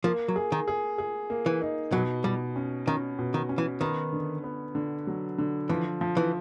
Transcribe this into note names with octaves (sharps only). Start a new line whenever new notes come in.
F3 A#3
F#3
G#4
D#3
G#4
G#4
A#3
E3
D#4
B2 F#3
B2 G3
C#4
D#3 C#4
B2
D#3
C#4
E3
D#3 B3
D3
B3
D3
F#3
D3
E3 F3
F3
E3